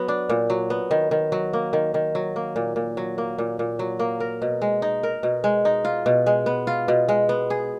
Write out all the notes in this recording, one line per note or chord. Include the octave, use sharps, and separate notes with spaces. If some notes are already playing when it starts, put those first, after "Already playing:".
Already playing: F#3 B3
D4
A#2
F#3
B3
D#3
D#3
F#3
A#3
D#3
D#3
F#3
A#3
A#2
A#2
F#3
A#3
A#2
A#2
F#3
A#3
A#4
B2
G#3
D#4
A#4
B2
G#3
D#4
F4
B2
G#3
B3
F4
B2
G#3
B3
G#4